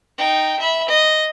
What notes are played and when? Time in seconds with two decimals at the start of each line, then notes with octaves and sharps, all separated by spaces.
0.18 D#4 G5
0.60 E5 B5
0.89 D#5